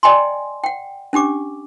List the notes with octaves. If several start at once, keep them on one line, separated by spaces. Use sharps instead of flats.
D5 D#5 G5 G#5 A#5 C6
F#5 G5
C#4 D4 G4 D6